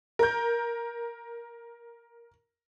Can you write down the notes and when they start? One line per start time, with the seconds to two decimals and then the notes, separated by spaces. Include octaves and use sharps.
0.19 A#4 G6